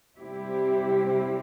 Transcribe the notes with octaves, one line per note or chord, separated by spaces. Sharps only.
C3 G3 C4 E4 G4